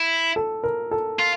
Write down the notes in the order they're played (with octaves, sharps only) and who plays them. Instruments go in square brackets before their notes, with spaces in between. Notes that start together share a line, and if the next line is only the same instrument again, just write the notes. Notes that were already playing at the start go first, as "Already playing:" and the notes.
Already playing: [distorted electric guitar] E4
[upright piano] A4
A#4
A4
[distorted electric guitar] F4